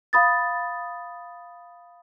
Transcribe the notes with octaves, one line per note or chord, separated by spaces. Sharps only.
F5 B5 D#6 A6